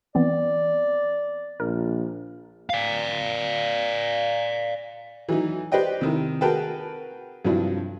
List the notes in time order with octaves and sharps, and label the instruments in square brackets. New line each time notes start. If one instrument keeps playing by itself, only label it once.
[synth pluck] E3 B3 C4 [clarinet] D5
[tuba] A#1 [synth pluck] A#4
[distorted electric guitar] D5 F5
[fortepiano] E3 F#3 D#4
G4 B4 C5 D5 D#5 G5
C3 D#3 E4
F#4 G#4 A#4 B4 G5 A5
G2 C3 F3 F#3 D4 E4